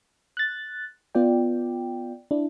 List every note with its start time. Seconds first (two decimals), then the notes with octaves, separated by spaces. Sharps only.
0.37 F#6 A6
1.15 B3 F4 D5 G5
2.31 D4 E4